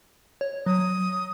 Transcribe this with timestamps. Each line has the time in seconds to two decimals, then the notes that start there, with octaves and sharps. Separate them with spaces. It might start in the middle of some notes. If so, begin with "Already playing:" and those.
0.41 C#5
0.66 F#3 D#6